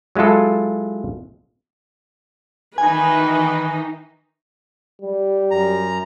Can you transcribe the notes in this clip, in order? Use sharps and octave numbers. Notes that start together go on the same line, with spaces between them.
F#3 G#3 E4 F4 A4
D#3 E3 D#4 B4 G#5
G3
F#2 A#5